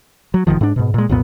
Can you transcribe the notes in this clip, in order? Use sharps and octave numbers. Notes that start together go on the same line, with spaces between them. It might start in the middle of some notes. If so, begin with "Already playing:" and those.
F#3
F#1 D#2 D#3 F3
G#2 D4
G#2 B2
A#2 G#3
C2 F2 A#2 B3